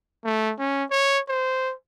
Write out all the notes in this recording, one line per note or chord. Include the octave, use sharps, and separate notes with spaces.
A3
C#4
C#5
C5